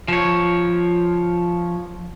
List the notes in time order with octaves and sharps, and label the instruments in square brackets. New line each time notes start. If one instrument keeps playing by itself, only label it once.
[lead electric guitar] F3 C#5